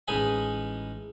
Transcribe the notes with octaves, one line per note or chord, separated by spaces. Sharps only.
A1 G#3 D#4 G#5 B5